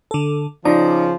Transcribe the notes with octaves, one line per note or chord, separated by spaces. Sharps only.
D3 A4
C#3 F3 D#4 D5